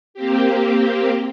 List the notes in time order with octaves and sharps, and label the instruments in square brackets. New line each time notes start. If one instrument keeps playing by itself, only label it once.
[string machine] A#3 C4 G4